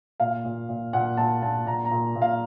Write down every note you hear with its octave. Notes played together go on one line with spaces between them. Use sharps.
A#2 F5
A#2
A#2
A#2 F#5
A#2 A5
A#2 A5
A#2 A#5
A#5
A#2
A#2
F5